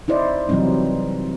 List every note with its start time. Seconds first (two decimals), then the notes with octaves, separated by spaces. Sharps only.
0.08 D#4 E4 C5 D5 D#5
0.49 C3 E3 F#3 G3 C4 D#4